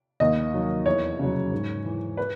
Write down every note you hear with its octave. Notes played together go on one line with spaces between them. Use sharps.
D#2 D#5
D#3 F#3
E2 C#5
C#3 F#3
G#2
E3
B4